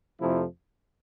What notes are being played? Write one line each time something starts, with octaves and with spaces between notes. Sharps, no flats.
F2 C3 F3 A3 E4